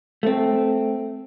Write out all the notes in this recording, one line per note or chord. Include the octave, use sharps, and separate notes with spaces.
A3 C4